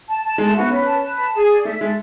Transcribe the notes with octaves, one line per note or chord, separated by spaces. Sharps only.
A5
A5
G#3 A5
A3
B3 F#4
C#4 B4
A5
B4
A5
G#4
D5
A3 E5
G#3 A4